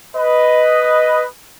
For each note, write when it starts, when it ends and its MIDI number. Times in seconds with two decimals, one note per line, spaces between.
0.16 1.26 71
0.16 1.26 75